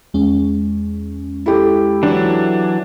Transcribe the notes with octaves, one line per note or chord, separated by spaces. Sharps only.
E2 G#3 C#4
E4 G4 A4
E3 F#3 D4